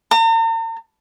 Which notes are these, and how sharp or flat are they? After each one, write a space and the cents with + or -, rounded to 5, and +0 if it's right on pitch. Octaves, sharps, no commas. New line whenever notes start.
A#5 -45